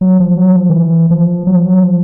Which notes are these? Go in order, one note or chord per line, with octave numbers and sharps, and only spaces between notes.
F#3
F3
F#3
F3
D#3
E3
F3
F#3
F3
F#3
F3